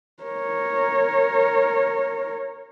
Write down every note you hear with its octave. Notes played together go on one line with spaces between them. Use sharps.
A#4 C#5